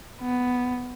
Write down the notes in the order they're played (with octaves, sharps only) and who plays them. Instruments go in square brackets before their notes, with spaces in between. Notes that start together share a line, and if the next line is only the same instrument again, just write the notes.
[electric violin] B3